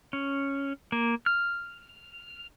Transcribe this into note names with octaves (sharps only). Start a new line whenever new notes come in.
C#4
A#3
F6